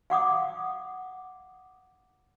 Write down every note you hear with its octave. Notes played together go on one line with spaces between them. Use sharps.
F5 F#5 D6 D#6